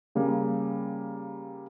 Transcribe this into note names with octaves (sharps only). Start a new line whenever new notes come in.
C#3 G3 A#3